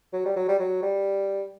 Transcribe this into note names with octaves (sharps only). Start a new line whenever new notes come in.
F#3
G3
F#3
G3
F#3
G3